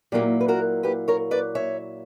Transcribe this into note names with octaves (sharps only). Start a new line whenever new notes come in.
A#2 F#3 A#3 E4 G4
B4
F#4 A#4
G4 B4
A#4 C#5
B4 D5
C#5 E5